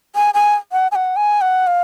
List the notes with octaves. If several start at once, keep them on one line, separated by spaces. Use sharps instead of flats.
G#5
G#5
F#5
G#5
F#5
G#5
F#5
F5